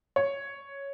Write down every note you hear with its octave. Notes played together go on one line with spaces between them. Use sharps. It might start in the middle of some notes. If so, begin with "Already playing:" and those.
C#5